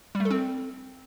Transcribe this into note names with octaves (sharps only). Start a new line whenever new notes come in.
G3
A3
A4
C4